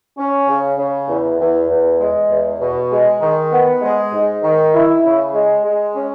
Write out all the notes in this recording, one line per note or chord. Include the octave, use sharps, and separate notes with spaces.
C#4
C#3
C#3
E2
E2
E2
G#3
E2
B2
G#3
D#3
B3
G#3
G#2
D#3
E4
C#3
G#3
G#3
C#4